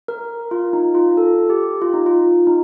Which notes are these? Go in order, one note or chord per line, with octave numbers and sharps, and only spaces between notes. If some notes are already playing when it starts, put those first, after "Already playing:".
A#4
F4
D#4
F4
A4
G4
F4
D#4
F4
D#4